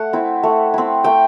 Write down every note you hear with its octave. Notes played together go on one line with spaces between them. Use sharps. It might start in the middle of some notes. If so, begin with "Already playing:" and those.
Already playing: A3 F#5
C4 E4
A3
C4 E4
A3 G5